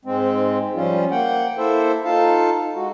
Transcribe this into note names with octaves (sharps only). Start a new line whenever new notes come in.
G#2 G#3 C4
F3 G3 C#4 F4
A#3 F#5 G5
A#3 E4 A4 C5 E5
D#4 F4 A4 F5 A5
G#3 F#4